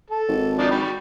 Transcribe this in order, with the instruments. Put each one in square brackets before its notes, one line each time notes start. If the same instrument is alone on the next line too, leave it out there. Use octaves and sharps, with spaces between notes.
[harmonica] A4
[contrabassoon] G#1
[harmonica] F3 D4 D#4
F#4 G5 B5